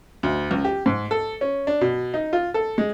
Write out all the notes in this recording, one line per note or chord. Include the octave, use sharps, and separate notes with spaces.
D2
C#2
G4
G#2
A4
C#4
D4
B2
D#4
F4
A4
G#3